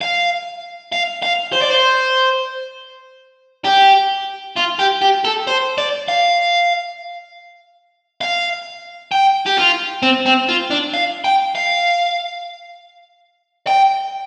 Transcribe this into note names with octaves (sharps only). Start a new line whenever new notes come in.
F5
F5
F5
C5
D5
C5
G4
F4
G4
G4
A4
C5
D5
F5
F5
G5
G4
F4
C4
C4
F4
D4
F5
G5
F5
G5